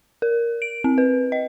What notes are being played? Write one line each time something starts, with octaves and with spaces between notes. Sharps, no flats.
A#4
D7
C4
B4
D#5